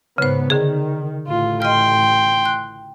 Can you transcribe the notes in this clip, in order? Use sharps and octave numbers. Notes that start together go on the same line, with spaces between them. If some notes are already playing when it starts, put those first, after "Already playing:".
G#2 C#3 B3 C5
D3 D#3 G#4
A1 A2 F4
D#5 G5 C6 F6
F#6